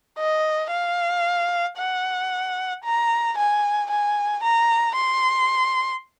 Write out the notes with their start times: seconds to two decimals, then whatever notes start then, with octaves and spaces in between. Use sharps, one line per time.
0.18 D#5
0.71 F5
1.78 F#5
2.84 A#5
3.37 G#5
3.91 G#5
4.43 A#5
4.96 C6